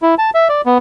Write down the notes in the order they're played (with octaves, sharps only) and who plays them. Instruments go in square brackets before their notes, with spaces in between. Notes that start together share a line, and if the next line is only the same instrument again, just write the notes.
[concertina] E4
A5
E5
D5
B3